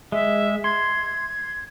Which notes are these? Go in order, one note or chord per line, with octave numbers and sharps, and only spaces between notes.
G#3 E5
C6 G#6